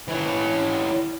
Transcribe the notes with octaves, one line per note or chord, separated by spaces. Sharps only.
E3 C#5